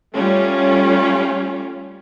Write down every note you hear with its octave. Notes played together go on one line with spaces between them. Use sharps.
G3 A3 C#4 F4